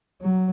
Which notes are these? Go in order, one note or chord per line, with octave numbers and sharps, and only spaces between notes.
F#3